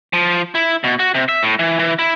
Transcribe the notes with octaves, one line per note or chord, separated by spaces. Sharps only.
F3
E4
B2
F#4
C3
E5
A2
E3
E3
E4